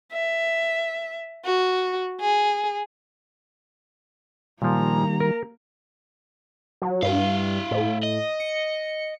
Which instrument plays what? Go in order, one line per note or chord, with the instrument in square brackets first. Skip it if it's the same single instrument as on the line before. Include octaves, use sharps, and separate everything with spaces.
[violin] E5
F#4
G#4
[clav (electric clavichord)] A#2 F3 [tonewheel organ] D#3 G3 [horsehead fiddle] A#3 A#5
[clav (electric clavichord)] A#4
[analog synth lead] F#3
[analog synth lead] G2 [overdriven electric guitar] E4 F5
[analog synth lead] A2
[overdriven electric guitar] D#5
[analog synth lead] C#7